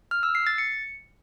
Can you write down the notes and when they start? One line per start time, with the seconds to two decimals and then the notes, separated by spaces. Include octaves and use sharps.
0.11 F6
0.23 E6
0.35 C7
0.47 A6
0.58 C#7